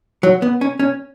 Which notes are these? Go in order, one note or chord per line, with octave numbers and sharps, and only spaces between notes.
F#3
B3
C#4
C#4